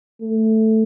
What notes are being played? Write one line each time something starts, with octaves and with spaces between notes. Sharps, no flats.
A3